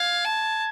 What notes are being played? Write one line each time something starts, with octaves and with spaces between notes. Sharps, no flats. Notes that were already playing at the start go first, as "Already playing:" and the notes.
Already playing: F5 G#6
A5